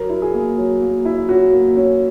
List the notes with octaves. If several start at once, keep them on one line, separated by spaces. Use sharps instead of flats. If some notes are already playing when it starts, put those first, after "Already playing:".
Already playing: F#3 A#4
E4
G#4
A#3
F#3
A#3
E4
C#4 F#4
A#3
C#4